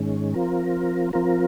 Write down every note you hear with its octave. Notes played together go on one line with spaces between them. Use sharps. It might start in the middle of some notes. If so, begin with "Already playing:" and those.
Already playing: G#2 D#3 G#3 C#4
F3 C4 F4 A#4
F3 C4 F4 A#4